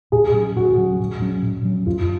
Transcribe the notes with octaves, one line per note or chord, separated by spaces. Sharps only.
A#2 G#4
F#3 C#4
A#2 F#4
F#3 C#4
A#2
F#3 C#4
A#2
F#3 C#4
F#2 F4